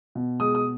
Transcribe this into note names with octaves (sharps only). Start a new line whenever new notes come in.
B2
G#3 D#6
D#6